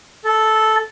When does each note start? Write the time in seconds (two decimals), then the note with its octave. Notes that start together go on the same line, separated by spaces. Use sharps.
0.24 A4